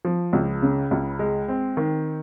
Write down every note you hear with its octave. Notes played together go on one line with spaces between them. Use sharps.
F3
C#2
C#3
C#2
G#3
C4
D#3